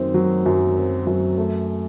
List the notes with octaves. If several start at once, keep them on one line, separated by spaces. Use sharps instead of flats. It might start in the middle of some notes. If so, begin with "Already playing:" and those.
Already playing: F#2 D#3 C4
F#3
F#2
C4
F#2
A3